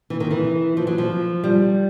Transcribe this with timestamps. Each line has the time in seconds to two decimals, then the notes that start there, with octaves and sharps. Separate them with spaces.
0.10 E3
0.20 D#3
0.31 E3
0.77 F3
0.87 F#3
0.98 F3
1.44 G3